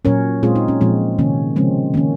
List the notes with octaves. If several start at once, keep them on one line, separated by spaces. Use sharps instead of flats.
A#2 F#3 C#4 A#4 C#5
A#2 G#3 C4 F4 G#4
D#4
C#4
A#2 F3 G#3 C4
C3 D#3 A#3 C#4
C#3 F3 G#3 C4 C#4
D#3 A#3 C#4